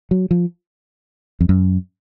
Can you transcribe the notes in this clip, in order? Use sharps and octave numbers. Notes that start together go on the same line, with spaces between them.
F#3
F3
F2
F#2